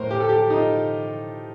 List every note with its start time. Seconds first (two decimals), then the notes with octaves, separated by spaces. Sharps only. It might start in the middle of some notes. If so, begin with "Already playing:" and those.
Already playing: A2 A#4 C5
0.11 G4
0.20 A4
0.29 G4
0.50 D#4
0.56 F4